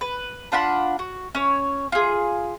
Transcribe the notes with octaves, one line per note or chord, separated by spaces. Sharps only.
B4
D4 F4 F#5 B5
F#4
C#4 C#5
F4 G#4